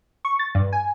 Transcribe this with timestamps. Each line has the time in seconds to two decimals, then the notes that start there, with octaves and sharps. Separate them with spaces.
0.25 C#6
0.39 A6
0.55 G2
0.73 G#5